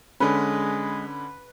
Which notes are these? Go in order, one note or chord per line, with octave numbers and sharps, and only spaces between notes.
D3 G#3 C#4 B4